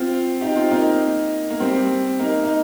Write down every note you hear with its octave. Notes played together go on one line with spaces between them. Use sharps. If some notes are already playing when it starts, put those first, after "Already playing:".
Already playing: C4 F4
D#4 G4
C4 F4
A#3 D#4
A#3
G3 C4
A#3 D#4
D#4